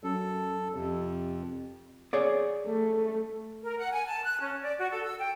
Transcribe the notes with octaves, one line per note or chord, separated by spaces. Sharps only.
F#2 A4
F2 C3
G#4 C#5 D5
A3
A#4
F#5
G#5
A5
F#6
C#4
D5
F#4
A4
E6
G5